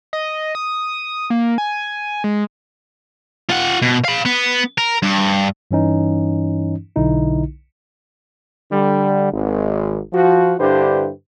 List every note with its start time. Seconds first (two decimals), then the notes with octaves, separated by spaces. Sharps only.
0.13 D#5
0.55 D#6
1.30 A#3
1.58 G#5
2.24 G#3
3.50 F4 F#5
3.82 B2
4.05 F5 B5
4.25 B3
4.78 A#4
5.03 G2
5.71 G2 E3 C#4 D#4
6.96 B1 D3 D#4 E4
8.71 D3 G3
9.32 G#1
10.13 F3 F#4
10.60 G2 D3 E4 G4 B4 C5